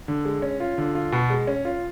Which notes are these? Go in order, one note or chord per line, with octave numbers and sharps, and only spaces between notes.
D3
G#3
C#4
F4
D3
F4
B2
G#3
C#4
F4